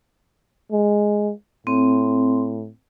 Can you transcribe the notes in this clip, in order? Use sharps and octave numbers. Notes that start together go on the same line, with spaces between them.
G#3
A2 C4